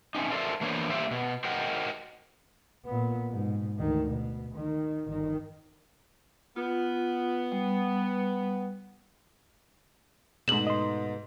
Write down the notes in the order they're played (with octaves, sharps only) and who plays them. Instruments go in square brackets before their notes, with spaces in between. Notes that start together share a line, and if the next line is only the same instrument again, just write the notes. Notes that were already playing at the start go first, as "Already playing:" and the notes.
[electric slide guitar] A3 C4 C#4 D#4
F#4 A4 A#4 C5 D5 E5
E3 A#3 B3 D4 C5 C#5
G3 A#3 C#4 F4 C5 E5
B2
F#4 A#4 C5 D#5 F#5 G5
[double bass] A#2 B3
G#2 B2
D2 D#3
B2
D#3
G1 D#3
[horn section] B3 [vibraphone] F4
[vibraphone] G3
[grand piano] G#2 A3 [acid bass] B2 [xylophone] E7 F#7
[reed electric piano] D#5 C6